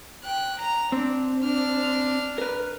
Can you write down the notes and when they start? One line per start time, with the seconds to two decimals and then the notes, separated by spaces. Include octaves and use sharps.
0.24 G5 F#6
0.60 A#5 F7
0.92 C4 D4
1.41 D4 F6
2.38 A#4 B4